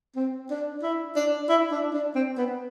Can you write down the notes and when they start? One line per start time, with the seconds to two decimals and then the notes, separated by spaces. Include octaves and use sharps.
0.16 C4
0.50 D4
0.82 E4
1.16 D4
1.49 E4
1.72 D4
1.94 D4
2.15 C4
2.38 B3